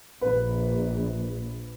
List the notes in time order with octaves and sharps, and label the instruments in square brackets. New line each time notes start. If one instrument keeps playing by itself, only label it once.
[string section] A#1 [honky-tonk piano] B4